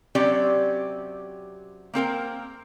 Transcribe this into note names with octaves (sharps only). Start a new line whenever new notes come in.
C3 F#3 C4 C#4 G4 D5
A#3 C4 A#4 G5